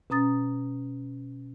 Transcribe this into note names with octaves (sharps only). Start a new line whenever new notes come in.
B2 C#4 A#5 D#6 A6